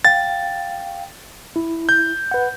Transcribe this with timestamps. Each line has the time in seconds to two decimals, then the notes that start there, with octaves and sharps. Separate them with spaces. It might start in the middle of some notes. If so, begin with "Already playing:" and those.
0.05 F5 G5 A6
1.56 E4
1.89 G6
2.31 B4 F#5